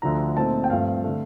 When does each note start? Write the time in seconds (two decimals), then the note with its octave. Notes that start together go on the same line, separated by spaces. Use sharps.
0.02 D2 D3 F3 A#5
0.36 A#2 A3 C4 D#4 A5
0.64 G5
0.70 G2 F3 A3 C4 F5
1.04 D3 A3